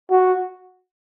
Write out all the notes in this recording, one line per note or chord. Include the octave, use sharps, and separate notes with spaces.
F#4